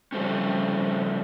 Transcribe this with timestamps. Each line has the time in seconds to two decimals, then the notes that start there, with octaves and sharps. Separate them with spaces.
0.12 C#3 F3 G3 A3 C4 C#4